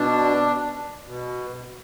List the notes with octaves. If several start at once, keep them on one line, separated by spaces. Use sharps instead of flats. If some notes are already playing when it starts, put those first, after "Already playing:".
Already playing: B2 D4
B2